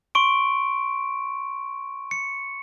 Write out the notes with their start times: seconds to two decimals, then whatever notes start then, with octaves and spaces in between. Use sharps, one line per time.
0.15 C6 C#6 D7
2.11 C#7